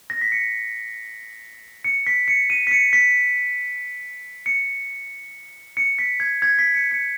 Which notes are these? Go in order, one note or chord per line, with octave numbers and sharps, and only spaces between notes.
A#6
B6
C#7
C#7
B6
C#7
D#7
B6
C#7
B6
C#7
C#7
B6
G#6
G#6
B6
C#7
C#7